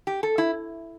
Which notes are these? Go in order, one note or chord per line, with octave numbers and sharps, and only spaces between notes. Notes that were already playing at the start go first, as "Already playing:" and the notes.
G4
A4
E4